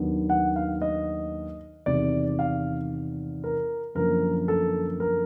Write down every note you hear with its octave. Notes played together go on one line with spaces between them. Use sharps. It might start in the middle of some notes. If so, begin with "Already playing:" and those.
Already playing: D#2 D#3 F#3 B3 D4
F#5
F5
D#5
E2 C3 D#3 D5
F5
A#4
F#2 D3 F3 A#3 A#4
A4
A#4